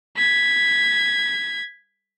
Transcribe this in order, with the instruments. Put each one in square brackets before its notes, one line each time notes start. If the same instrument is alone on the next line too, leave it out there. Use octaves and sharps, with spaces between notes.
[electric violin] G#6 B6